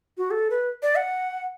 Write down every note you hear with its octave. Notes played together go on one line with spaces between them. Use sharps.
F#4
A4
B4
D5
F#5